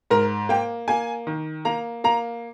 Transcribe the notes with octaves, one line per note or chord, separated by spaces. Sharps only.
G#2 A#4
A#3 G5
A#3 G#5
D#3
A#3 A#5
A#3 A#5